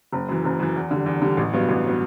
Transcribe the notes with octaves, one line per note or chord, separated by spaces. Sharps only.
F#1
F#2 E3
F#1
F#2 E3
E2
D3 G3
E2
D3 G3
A1
G2 F#3 B3
A1
F#3 B3